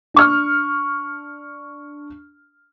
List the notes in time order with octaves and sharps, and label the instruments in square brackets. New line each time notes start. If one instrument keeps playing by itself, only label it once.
[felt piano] D4 C#6 F6